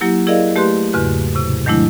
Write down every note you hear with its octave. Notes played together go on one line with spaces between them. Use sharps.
F#3 A#3 E4 G4
E4 G#4 A#4 D5 D#5 F5
A3 G4 B4 C6 F#6
E2 G#2 C#3 F#4 B4 F#6
A2 C3
D#3 F#3 G#3 A3 D4 E4